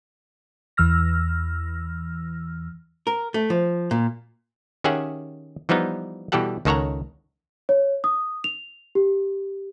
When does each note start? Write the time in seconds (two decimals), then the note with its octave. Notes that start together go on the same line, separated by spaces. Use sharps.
0.77 E2 E3 E6 F6 A#6
3.07 A#4
3.34 A3
3.50 F3
3.91 A#2
4.84 D#3 C#4 G4 G#4 E5 F#5
5.69 E3 F3 G3 B3 D#4
6.32 B2 E3 G3 G4 A4 F#5
6.65 C#2 D#3 A4 C#5 F#5 A#5
7.69 C#5
8.04 D#6
8.44 F7
8.95 G4